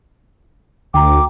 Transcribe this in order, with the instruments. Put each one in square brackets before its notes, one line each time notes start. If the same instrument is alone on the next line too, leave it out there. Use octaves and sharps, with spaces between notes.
[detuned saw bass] D2 [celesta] G5 A#5 [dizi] D6